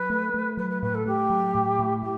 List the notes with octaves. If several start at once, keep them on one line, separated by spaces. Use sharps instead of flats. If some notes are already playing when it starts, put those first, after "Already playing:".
Already playing: F#3 B4
A3
A3
F#3 B4
B4
A2 B4
A4
A3 G4
F#3
A2
A2
A2 G4